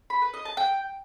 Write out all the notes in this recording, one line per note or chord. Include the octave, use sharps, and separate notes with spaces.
B5
B4
D#5
A5
G5